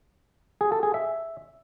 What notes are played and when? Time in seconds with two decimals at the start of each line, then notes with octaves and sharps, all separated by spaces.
0.61 G#4
0.72 A4
0.83 G#4
0.94 E5